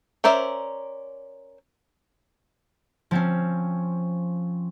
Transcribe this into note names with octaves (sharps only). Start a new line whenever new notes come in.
C#4 A#4 C5 D5 E5
F3 C4 C#4